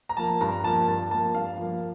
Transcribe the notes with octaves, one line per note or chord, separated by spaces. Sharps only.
A#5
F3 A#3 A5
G2 A#5
F3 A#3 A5
G2 A5
F3 A#3 A5
G2 F5
F3 A#3